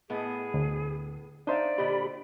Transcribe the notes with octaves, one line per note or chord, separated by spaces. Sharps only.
A2 B3 G#4 D#5
D2
D4 D#4 C5 D5 E5 F5
A#2 D3 G4 D#5 B5